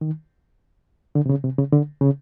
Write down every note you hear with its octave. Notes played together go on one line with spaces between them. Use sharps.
D#3
D3
C3
C#3
C3
C#3
D3
C#3